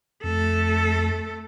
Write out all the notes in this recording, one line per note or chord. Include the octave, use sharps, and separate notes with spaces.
F2 A3 A4